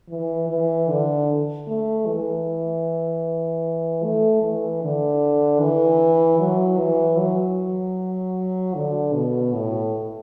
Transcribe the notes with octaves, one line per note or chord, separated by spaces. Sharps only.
E3
E3
D3
A3
E3
A3
E3
D3
E3
F#3
E3
F#3
D3
B2
A2